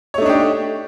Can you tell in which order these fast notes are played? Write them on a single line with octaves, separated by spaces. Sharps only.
C#5 A3 D#4 D4 G4